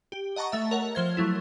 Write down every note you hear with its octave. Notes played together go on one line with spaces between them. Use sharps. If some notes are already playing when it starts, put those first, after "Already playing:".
G4
D#5 F#5 A5 A#5 C#6
A3 E5
A#4 C#5 F#5
F3 C5 G#6
F#3 A3 E4